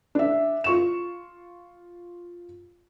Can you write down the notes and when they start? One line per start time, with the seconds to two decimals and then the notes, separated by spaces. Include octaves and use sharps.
0.15 D4 E5
0.64 F4 C#6 E7